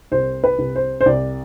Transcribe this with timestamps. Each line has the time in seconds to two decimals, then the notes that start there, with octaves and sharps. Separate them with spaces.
0.12 C2 C5
0.44 B4
0.59 C2
0.75 C5
1.01 C5
1.06 C2 D5